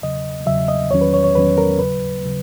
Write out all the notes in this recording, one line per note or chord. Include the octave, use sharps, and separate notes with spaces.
E2 C#3 F#3 D#5
E2 C#3 F#3 E5
D#5
E2 D#3 F#3 C#4 C#5
B4
C#5
C#5
E2 D#3 F#3 C#4 B4
A#4
D#2 C#3 F#3 B4
C#3 F#3